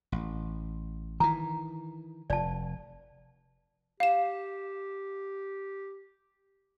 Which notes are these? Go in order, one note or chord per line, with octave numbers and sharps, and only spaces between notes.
A1
D#3 E3 A#5
F1 D5 A5
G4 F5 E7